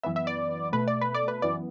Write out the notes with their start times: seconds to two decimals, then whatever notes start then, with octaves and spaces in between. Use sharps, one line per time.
0.03 F#2 E3 B3 E5
0.16 E5
0.27 D5
0.73 B2 A3 B4
0.88 D5
1.01 B4
1.15 D5
1.28 B4
1.42 F#2 E3 B3 D5